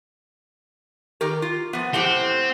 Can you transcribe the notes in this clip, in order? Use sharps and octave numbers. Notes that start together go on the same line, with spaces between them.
D#3 G4 A#4
F4
F3 B3
A2 C4 G4 F#5